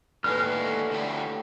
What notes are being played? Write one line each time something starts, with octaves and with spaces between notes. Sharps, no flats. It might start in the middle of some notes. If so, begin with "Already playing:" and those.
D#2 A2 D3 G#3 B4 F6
D2 G3